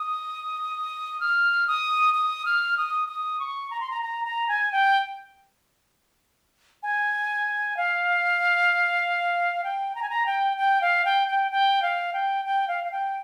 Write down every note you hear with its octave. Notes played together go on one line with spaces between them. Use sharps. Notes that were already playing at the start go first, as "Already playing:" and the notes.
Already playing: D#6
F6
D#6
D#6
F6
D#6
D#6
C#6
A#5
C6
A#5
A#5
A#5
G#5
G5
G#5
F5
G5
A#5
G#5
A#5
G5
G5
F5
G5
G5
G5
F5
G5
G5
F5
F5
G5